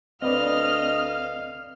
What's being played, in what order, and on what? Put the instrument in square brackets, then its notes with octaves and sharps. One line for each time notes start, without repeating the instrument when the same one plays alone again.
[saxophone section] D2 D#5 [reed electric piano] C4 B4 D5 [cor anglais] F5 [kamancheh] F6